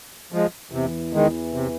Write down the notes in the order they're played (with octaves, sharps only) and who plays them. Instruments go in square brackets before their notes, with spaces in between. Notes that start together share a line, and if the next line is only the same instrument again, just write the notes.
[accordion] F3 G#3
[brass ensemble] E2 E3 [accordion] C3
[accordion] D#3 G#3
C3